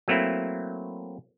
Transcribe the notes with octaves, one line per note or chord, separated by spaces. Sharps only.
F#3 A3 A#3 C4 E4